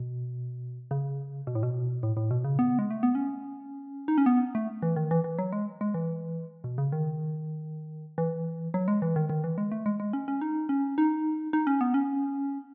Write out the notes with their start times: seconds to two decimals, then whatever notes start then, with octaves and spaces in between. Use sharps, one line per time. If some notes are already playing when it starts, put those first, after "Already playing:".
Already playing: B2
0.91 C#3
1.47 B2
1.55 A2
1.63 B2
2.03 A2
2.17 A2
2.31 B2
2.44 C#3
2.59 B3
2.79 G#3
2.91 A3
3.03 B3
3.15 C#4
4.08 D#4
4.18 C#4
4.26 B3
4.55 A3
4.82 E3
4.96 D#3
5.11 E3
5.24 E3
5.39 F#3
5.52 G#3
5.81 G#3
5.94 E3
6.64 B2
6.78 C#3
6.92 D#3
8.18 E3
8.74 F#3
8.88 G#3
9.02 E3
9.16 D#3
9.29 D#3
9.44 E3
9.58 G#3
9.72 A3
9.86 G#3
10.00 G#3
10.13 C#4
10.28 C#4
10.41 D#4
10.69 C#4
10.98 D#4
11.53 D#4
11.67 C#4
11.81 B3
11.94 C#4